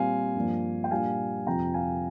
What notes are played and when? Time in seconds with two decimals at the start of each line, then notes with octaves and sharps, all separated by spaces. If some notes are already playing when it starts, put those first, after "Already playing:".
Already playing: A#2 G3 C4 F5 G#5
0.36 G2 F3 A#3 D4
0.84 G5
0.91 A#2 G3 A#3 D4 F5 G#5
1.46 F2 C3 F3 G5 A#5
1.74 F5 G#5